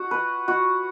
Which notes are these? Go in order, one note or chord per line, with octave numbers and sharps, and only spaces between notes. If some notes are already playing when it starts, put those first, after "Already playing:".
Already playing: F#4
B4
F#4